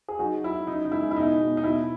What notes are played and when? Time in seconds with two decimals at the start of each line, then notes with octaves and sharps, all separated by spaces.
0.08 G#4
0.19 F#3 D#4 F#4
0.44 F#3 E4
0.67 C#3 D#4
0.85 D#4
0.92 G#3 E4
1.11 E4
1.16 B2 D#4
1.40 B2
1.57 D#4
1.64 B2 E4